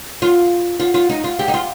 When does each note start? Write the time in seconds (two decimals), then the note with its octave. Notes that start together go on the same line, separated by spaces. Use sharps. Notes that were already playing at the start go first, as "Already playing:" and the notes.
0.22 F4
0.80 F4
0.94 F4
1.09 D#4
1.24 F4
1.39 G4
1.48 D#4
1.54 F4